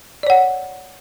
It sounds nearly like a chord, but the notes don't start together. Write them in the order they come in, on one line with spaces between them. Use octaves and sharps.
D5 C#5 F#5